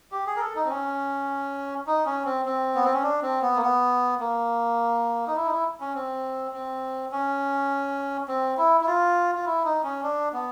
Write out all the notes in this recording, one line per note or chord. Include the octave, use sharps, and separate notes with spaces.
G4
G#4
A#4
A4
D#4
C4
C#4
D#4
C#4
C4
C4
B3
C4
C#4
D4
C4
B3
A#3
B3
A#3
D#4
E4
D#4
E4
C#4
C4
C4
C#4
C4
E4
E4
F4
F4
E4
D#4
C#4
D4
B3